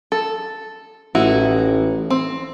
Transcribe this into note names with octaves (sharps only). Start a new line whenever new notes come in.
A4
A1 D#4 E4 F#4
C4